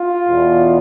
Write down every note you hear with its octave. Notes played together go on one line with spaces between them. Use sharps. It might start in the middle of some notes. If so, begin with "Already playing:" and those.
Already playing: F4
E2 B2